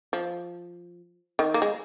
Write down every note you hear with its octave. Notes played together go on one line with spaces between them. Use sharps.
F3
D#3
A#3
G#3